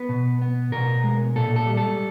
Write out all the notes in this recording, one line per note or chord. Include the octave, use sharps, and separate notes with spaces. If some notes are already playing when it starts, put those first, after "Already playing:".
Already playing: B3 B4
B2
B3
B2 A#4
G#3
A#2 A4
A4
G3
A4